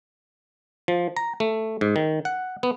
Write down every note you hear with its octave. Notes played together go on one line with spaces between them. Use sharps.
F3
A#5
A3
G#2
D#3
F#5
B3